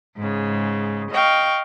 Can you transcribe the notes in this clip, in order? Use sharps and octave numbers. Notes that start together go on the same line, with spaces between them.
G#2 C#3
D#5 F5 G5 C#6